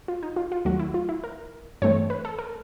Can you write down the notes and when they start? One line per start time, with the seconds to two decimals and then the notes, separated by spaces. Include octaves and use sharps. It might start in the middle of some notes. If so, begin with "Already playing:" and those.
0.08 F4
0.23 D#4
0.36 F4
0.52 F4
0.65 D#2 D#3 F#3 A3 F#4
0.79 E4
0.94 F4
1.09 E4
1.24 A#4
1.82 G2 E3 A3 C4 C#5
2.10 B4
2.25 A4
2.39 A#4